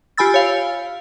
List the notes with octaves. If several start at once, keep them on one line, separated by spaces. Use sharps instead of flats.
F4 G4 G#5 B5 E6 A6
C#5 F5